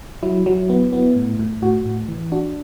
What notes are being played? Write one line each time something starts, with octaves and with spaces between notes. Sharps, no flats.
F#3 E4
F#3
B3
B3
A2
A2
A2 F#4
A2
E3
D4 F#4